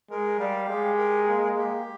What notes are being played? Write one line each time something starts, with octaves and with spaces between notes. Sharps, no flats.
G#3 A#4
G3 F5
G#3 G4
A#4
A#3
G4